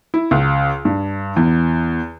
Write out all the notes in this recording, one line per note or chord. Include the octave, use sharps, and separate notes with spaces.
E4
C#2
G2
E2